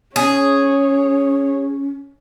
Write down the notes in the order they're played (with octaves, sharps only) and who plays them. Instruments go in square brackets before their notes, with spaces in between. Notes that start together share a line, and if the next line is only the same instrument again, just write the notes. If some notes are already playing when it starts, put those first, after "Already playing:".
[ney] C#4 [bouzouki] G#4 [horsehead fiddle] C#5